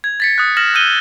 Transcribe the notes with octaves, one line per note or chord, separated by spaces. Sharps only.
G#6
A6 B6 C#7
D#6 F#6
F6 A#6 E7 F#7
E6 G6 D#7 G7